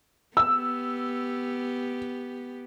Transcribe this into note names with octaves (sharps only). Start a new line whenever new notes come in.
B3 G4 E6